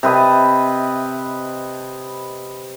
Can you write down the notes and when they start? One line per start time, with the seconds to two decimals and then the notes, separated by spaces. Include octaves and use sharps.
0.03 C3 B4 D#5 A5